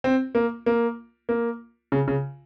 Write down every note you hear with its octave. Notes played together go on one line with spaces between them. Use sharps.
C4
A#3
A#3
A#3
C#3
C#3